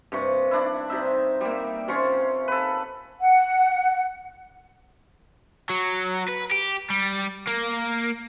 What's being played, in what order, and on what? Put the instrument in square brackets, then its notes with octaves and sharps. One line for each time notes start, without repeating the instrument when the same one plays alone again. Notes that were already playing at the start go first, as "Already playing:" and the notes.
[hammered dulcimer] G2 C3 C#6
D4 E4
C3 D#4 E5
G3 A#3
C3 C#4 F4 C#6
A4 B4
[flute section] F#5
[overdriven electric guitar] F#3
B4
G4
G3
A#3